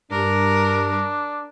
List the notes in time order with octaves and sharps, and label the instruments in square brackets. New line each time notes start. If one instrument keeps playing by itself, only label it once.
[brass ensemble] G2 [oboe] D4 [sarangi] A#4